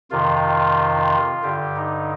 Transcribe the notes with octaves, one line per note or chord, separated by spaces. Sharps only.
F2 C3 D#3 F4
G2 D3 G4
D#4